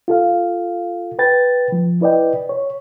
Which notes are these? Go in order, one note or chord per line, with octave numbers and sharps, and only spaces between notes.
F4 A4 F5
B4 G5 A6
F3
E4 B4 D5 D#5 G5
C#5